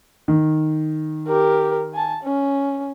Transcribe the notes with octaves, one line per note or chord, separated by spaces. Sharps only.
D#3
G4 A#4
G#5 A5
C#4